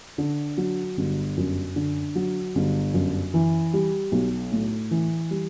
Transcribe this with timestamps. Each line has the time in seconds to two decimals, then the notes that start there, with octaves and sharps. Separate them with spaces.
0.18 D3
0.58 F#3
0.98 G1
1.37 F#2
1.76 D3
2.15 F#3
2.56 G1
2.94 F#2
3.34 E3
3.74 G3
4.12 B1
4.52 A2
4.91 E3
5.31 G3